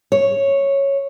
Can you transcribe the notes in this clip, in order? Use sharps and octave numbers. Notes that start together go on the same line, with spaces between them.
C#5